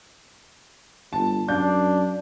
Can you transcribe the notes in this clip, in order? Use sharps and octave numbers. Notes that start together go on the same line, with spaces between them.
G1 A5
F#2 D4 D5 F5 G6